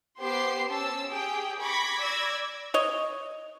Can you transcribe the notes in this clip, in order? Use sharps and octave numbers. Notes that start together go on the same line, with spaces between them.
B3 G4 C5 C6 C7
C#4 A5 E6
G4 G#4 G5
B5 C#6 D6 G#6 A#6 B6
D5 E6 G#6 A#6
C#5 D#5